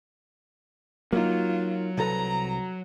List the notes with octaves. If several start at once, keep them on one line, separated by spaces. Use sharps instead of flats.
F#3 A#3 D#4 F4
C2 A4 B4 A#5